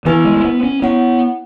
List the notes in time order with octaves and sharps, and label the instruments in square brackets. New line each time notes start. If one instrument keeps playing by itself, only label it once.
[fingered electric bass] E3 [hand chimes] B3 E4 B4 G#5
[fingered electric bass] G#3
G#3
B3
C#4
[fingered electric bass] B3 [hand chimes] E4 C#5 F#5